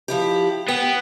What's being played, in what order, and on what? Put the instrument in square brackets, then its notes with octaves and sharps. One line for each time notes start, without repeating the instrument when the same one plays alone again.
[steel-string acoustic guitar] F3 E4 G4
[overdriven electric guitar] B3 [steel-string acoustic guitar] G5